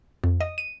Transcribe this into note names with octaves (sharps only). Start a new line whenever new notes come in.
F2
D#5
D#7